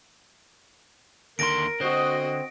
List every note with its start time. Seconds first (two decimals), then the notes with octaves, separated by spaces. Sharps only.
1.39 D#2 D3 A#4 C6 A#6 D7
1.80 D3 C4 F#4 C5 D#5